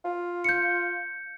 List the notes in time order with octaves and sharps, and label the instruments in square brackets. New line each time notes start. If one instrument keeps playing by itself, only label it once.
[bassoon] F4
[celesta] G6 C#7